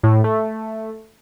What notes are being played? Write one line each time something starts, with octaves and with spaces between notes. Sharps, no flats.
A2
A3